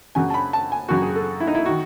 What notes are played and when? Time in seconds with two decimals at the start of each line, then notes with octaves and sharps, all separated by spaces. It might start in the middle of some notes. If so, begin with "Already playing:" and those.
0.15 F#2 C#3 F#3 G#5
0.30 A5
0.34 B5
0.53 A5
0.72 G#5
0.88 F#2 C#3 F#3 F#4
1.02 G#4
1.15 A4
1.40 E4
1.47 D#4
1.55 E4
1.66 D#3 F#4